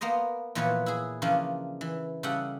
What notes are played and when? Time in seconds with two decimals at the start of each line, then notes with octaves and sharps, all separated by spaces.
0.01 A#3 B3 C5 D#5
0.55 A#2 E3 F3 B3 B4 C#5
0.86 E4 G#4
1.22 C#3 E3 F3 A#3 C#4 D4
1.81 E3
2.23 C#3 G3 C#4 G4 A4 F#5